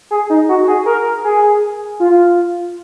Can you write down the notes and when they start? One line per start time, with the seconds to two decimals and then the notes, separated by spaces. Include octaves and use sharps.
0.11 G#4
0.30 D#4
0.49 F#4
0.67 G#4
0.86 A#4
1.24 G#4
2.00 F4